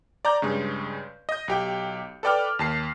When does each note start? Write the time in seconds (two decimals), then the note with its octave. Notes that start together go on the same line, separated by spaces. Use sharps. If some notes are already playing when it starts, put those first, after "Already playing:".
0.25 D5 A#5 G6
0.42 G2 C#3 G#3
1.29 D#5 G6
1.48 B1 G4 G5
2.23 A4 B4 D5 G5 D6 F6
2.59 D#2 A5 C7